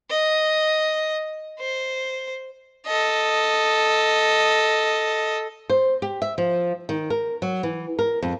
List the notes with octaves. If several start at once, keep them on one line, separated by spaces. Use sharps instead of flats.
D#5
C5
A4 D#5
C5
G4
E5
F3
D#3
A#4
F#3
E3
A#4
F2